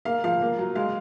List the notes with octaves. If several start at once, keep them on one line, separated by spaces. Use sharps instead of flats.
A#3 F5
F3 F5
A#3
F#3
G#3 F5